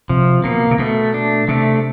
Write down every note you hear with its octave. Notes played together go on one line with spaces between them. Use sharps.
C3 F3
B2 A#3
C3
B2 A3
D4
C3 A3